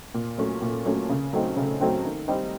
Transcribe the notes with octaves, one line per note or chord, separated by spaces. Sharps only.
A#2
F#3 A3 C#4
A#2
F#3 A3 C#4
C#3
F#3 A3 C4 D#4
C#3
F#3 A3 C4 D#4
D#3
G3 C4 D#4